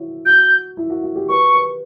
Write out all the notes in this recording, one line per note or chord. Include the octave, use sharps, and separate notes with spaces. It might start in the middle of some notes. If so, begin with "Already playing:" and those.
Already playing: E4 F#4 C#5
F#4 G6
E4
F#4
F#4
G4
B4 C#6
B4